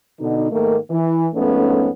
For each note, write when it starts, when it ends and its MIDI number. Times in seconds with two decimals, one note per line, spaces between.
0.20 0.48 47
0.20 0.48 50
0.20 0.48 63
0.51 0.77 44
0.51 0.77 51
0.51 0.77 57
0.51 0.77 58
0.90 1.27 52
1.34 1.88 41
1.34 1.88 44
1.34 1.88 57
1.34 1.88 59
1.34 1.88 61